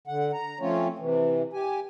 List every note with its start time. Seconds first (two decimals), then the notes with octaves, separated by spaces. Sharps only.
0.07 D3 F#5
0.33 A#5
0.60 F3 A3 C4 C#4 F4 C#5
0.99 C3 E3
1.53 G4 G#5